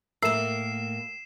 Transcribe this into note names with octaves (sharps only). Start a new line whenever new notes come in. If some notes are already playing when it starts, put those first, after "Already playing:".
A2 A#3 A4 A#4 E5 E6 C7 E7